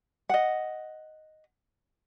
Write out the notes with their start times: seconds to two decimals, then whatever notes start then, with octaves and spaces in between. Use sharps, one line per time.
0.29 D#5 F#5